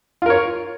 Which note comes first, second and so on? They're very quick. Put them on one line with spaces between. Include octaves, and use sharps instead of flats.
F4 A#4 C#5